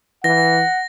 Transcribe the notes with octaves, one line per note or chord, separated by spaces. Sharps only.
E3 F#5 A#6